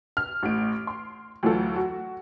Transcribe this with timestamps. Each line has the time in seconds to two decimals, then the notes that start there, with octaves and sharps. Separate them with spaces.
0.17 F6
0.43 A1 A2 D7
0.87 C6
1.43 D2 E3 F#3 F4 A4
1.76 F#4